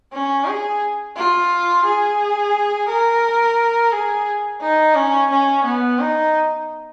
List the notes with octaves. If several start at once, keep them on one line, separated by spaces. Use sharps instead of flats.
C#4
G#4
F4
G#4
A#4
G#4
D#4
C#4
C#4
B3
D#4